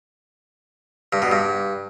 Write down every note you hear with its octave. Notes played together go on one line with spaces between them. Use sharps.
G2
B2
G2